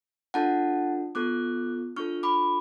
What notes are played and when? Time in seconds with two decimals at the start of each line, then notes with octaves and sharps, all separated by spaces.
0.34 D4 F4 A4 F#5 A5
1.15 B3 F4 A4 D6 F#6
1.96 D4 F4 A4 C#6 F6
2.23 B5 D6